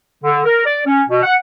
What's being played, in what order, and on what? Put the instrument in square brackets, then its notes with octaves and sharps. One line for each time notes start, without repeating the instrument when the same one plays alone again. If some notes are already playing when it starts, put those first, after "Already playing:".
[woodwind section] D3
A#4
D5
C#4
B2
F#5